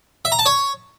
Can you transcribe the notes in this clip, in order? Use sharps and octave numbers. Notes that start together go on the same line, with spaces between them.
E5
A#5
A5
C#5